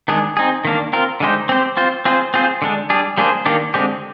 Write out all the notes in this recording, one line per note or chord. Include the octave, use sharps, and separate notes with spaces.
D#3 G#3 D4 G#4
C4 D#4 G#4
D#3 A#3 D4
C4 F4 A#4
D3 G#3 D#4 G4 C5
C4 G4 C5
C4 F4 C5
C4 F4 G#4 C5
C4 F4 G#4 C5
D3 G#3 D4
G3 D4 G#4
G3 A#3 D4 G#4 C5
D#3 A#3 D4 G4
D3 G#3 C4 G4